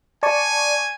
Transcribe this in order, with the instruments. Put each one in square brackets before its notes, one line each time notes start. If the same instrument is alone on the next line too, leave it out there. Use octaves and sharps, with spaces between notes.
[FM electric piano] D5 A5 C#6 [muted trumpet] G#5